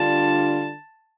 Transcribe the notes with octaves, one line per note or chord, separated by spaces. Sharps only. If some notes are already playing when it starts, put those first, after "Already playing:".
Already playing: D3 G3 D4 F4 A5